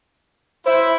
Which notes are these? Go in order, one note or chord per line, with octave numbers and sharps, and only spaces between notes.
E4 C5